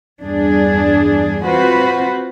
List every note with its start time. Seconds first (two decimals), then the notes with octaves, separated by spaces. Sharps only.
0.21 E2 G2 D4 G#4
1.45 C4 F4 F#4 B4 C5